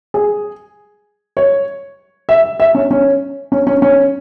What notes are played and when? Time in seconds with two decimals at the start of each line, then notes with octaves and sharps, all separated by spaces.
0.14 G#4
1.37 C#5
2.29 E5
2.60 E5
2.75 C#4
2.91 C#4
3.52 C#4
3.67 C#4
3.82 C#4